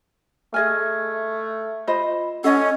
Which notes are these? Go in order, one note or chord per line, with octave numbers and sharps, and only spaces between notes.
A3 G#4 D#5 G#5 F6 G#6
F4 C5 D#5 B5
C#4 A4 D#5 F#5 G#5